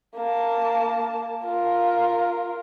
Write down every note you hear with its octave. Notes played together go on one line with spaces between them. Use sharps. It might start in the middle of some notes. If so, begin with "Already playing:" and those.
A#3 A5
F4 A#4